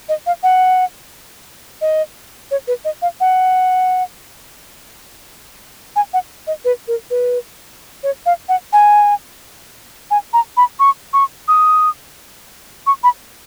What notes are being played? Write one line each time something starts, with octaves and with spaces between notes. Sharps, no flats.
D#5
F5
F#5
D#5
C#5
B4
D#5
F5
F#5
G#5
F#5
D#5
B4
A#4
B4
C#5
F5
F#5
G#5
G#5
A#5
B5
C#6
C#6
D#6
C#6
B5